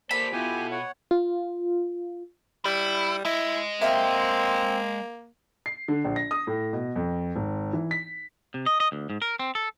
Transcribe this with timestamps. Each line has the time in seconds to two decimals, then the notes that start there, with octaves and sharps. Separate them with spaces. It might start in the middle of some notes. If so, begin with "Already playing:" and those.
0.11 A#3 G4 A4 C5 D5 B5
0.33 B2 E4 F4 G4 A4 G#5
0.71 C#5 F#5
1.11 F4
2.65 G3 E4
3.25 G#3 E4 D#5
3.82 A#3 C4 E5 F5 G5
5.66 C7
5.88 D3
6.04 A#1
6.16 A#6
6.31 D#6
6.47 A2
6.73 B2
6.96 F2
7.36 G#1
7.73 E3
7.91 B6
8.54 C3
8.66 D#5
8.80 D#5
8.92 D2
9.10 G#2
9.22 A#4
9.39 C4
9.55 A4